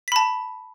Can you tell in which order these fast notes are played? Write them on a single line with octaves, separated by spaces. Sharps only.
B6 B5 A5